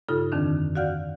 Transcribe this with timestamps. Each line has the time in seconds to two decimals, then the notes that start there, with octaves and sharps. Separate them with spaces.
0.08 G2 C#3 D#4 F4 A4
0.32 F2 D3 D#3 C4 D4
0.75 F#4 D5 F5 F#5 F6 G6